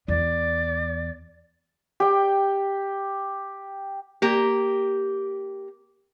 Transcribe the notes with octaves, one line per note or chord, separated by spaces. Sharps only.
E2 D5
G4 G5
A#3 G4